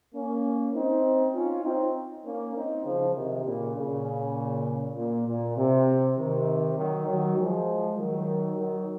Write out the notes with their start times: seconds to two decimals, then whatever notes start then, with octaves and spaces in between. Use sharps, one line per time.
0.14 A#3 C#4
0.73 C4 D#4
1.34 C#4 F4
1.64 C4 D#4
2.25 A#3 C#4
2.55 C4 D#4
2.85 C#3 F3
3.15 C3 D#3
3.45 A#2 C#3
3.76 A#2 C#3
4.96 A#2
5.27 A#2
5.57 C3
6.17 C3 D#3
6.77 D#3 F#3
7.07 D#3 F#3
7.37 F3 G#3
7.98 D#3 F#3
8.58 D#3 F#3